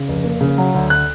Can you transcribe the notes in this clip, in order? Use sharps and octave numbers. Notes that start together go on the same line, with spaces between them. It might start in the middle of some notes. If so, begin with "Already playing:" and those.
Already playing: C#3
F1
A#3
C#3
F#3
D2
F#6